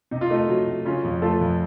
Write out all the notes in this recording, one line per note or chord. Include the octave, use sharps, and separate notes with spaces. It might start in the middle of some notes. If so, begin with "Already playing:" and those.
C3 D#4
F4
A3 D#4
F#3
F#3
C#3 C#4 F4
F2
A3 F4 A4
F2